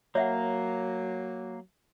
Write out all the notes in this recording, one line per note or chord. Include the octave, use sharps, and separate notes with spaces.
F#3 A#3 C#5 E5 F#5